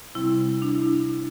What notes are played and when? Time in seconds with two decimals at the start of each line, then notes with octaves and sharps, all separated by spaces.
0.15 C3 G3 C4 E4
0.62 D4
0.75 E4